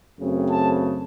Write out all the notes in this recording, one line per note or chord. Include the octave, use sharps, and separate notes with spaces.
F#2 C#3 A3 C4
A5